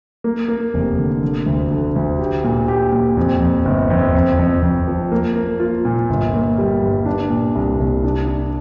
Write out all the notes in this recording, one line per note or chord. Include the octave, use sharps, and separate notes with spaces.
A#3
A#3
F1
D3
D3
D2
D3
D2
G4
A#2
G4
A#2
F2
F2
G1
F2
F2
F2
F2
F3
A#3
A#3
F4
A#2
G1
A#3
G3
G2
D4
A#2
C2
C2
D4
D4